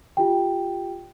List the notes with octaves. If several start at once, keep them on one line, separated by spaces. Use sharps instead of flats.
F4 G4 G5